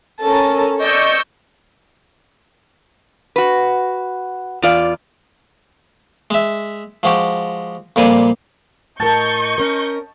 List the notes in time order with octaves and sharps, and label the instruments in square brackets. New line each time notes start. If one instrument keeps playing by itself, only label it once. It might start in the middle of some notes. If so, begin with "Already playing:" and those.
[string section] C#4 A4 A#4 A5
D5 D#5 C#6 E6 G6
[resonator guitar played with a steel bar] F#4 B4
E2 F4 D5
[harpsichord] G#3 E5
F3 G#3 F#4 G4
F2 A#2 G3 G#5
[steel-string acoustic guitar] A2 A#4 [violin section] D#5 C#6 G6 [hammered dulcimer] A5
[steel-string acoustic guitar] C#4 A#4